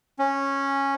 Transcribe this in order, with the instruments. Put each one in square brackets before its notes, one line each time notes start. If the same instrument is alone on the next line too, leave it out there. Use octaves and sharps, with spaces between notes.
[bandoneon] C#4